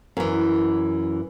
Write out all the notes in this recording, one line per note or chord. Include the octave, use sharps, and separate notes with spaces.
F#2 E3